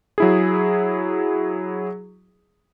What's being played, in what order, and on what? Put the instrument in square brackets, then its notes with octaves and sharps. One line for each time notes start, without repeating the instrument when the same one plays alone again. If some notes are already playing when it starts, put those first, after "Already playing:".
[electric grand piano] F#3 E4 G#4